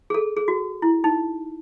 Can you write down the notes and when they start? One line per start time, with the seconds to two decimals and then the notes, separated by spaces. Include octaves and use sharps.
0.10 G#4
0.14 A4
0.37 G#4
0.48 F#4
0.82 E4
1.04 D#4